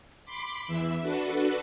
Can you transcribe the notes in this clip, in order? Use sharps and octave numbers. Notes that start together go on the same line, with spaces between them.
B5 C6 D6 B6
E2 E3 E5
D4 F#4 A4 B4